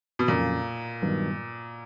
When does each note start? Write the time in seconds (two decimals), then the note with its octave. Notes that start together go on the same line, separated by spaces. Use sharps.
0.19 B2
0.28 F2 A#2 C#3 F#3
1.02 G2 D#3 F#3 B3